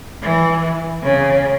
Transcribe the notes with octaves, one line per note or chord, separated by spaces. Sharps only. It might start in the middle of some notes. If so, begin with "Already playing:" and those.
E3
C#3